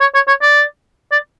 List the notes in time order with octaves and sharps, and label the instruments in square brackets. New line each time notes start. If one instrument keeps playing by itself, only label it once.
[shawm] C#5
C#5
C#5
D5
D5